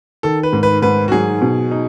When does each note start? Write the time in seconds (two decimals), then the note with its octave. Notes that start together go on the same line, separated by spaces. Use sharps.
0.23 D#3 A4
0.43 B4
0.53 G#2
0.63 B4
0.82 G#2 B4
1.08 F#4
1.12 F#3 G#4
1.42 B2
1.71 D#4